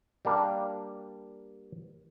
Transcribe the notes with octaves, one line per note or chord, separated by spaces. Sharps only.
G3 A#3 D4